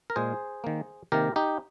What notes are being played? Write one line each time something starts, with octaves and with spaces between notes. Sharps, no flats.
A#4
A#2 G#3 G#4 C5
D#3 A#3
C3 D#3 A#3 G4 A#4
D#4 G4